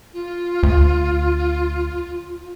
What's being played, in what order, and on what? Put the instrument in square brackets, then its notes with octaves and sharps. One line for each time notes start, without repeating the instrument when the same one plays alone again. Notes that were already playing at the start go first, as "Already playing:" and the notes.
[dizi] F4
[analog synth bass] D2